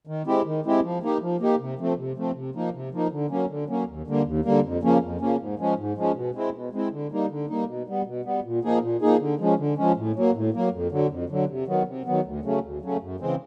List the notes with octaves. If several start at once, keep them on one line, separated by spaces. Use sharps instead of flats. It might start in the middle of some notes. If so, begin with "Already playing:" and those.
D#3
G#3 C4 E4 G4
D#3
G#3 C4 E4 G4
F3
A#3 D#4 G4
F3
A#3 D#4 G4
C3
F3 A3 C4
C3
F3 A3 C4
C3
F3 A#3 D#4
C3
F3 A#3 D#4
D3
F#3 A#3 C#4
D3
F#3 A#3 C#4
D#2
D3 G3 A#3
D#2
D3 G3 A#3
F2
C#3 F3 A#3 C#4
F2
C#3 F3 A#3 C#4
G#2
F3 G#3 C#4
G#2
F3 G#3 C#4
B2
G#3 C4 E4
B2
G#3 C4 E4
D3
G3 A#3 D#4
D3
G3 A#3 D#4
B2
G3 B3
B2
G3 B3
A#2
F3 A#3 D#4 G#4
A#2
F3 A#3 D#4 G#4
D3
F3 G#3 C#4
D3
F3 G#3 C#4
A2
F#3 A#3
A2
F#3 A#3
F2
D3 F#3
F2
D3 F#3
C3
D#3 F#3 B3
C3
D#3 F#3 B3
D2
C#3 F#3 A3 C#4
D2
C#3 F#3 A3 C#4
F#2
C#3 E3 G#3 C4